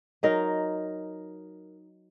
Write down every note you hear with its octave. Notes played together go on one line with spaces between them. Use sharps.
F#3 D#4 A#4